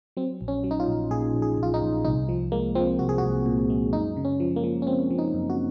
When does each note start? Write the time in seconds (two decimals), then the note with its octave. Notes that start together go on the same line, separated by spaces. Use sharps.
0.17 F#3 C4
0.41 A#1
0.48 C#4
0.64 F#3
0.71 D#4
0.80 F4
0.88 A#1
1.11 A#2 G#4
1.34 A#1
1.42 G#4
1.58 A#1 F4
1.74 D#4
1.82 A#1
2.05 C2 D#4
2.29 F3
2.52 G#3 A#3
2.75 F3 C4
2.99 C2 F#4
3.09 G#4
3.18 C2 F#4
3.46 A#2
3.70 G#3
3.93 F#2 D#4
4.17 C#3
4.25 C#4
4.40 F3
4.56 A#3
4.64 F3
4.82 C#4
4.87 G#3 C4
5.11 F3
5.18 D#4
5.34 F#2
5.50 F#4